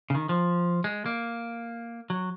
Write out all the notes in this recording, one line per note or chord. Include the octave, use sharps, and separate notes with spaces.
C#3
D#3
F3
G#3
A#3
F#3